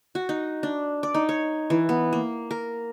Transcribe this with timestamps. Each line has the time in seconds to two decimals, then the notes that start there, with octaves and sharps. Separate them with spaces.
0.15 F#4
0.29 D#4
0.63 D4
1.03 D5
1.14 D#4
1.29 C#5
1.70 E3
1.89 B3
2.13 A#3
2.51 A#4